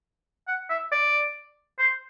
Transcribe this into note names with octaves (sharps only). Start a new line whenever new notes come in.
F#5
E5
D5
C5